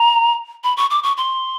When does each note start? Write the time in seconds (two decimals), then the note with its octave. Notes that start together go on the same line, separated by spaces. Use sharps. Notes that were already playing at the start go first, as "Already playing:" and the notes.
Already playing: A#5
0.64 B5
0.77 C#6
0.90 D6
1.04 C#6
1.17 C6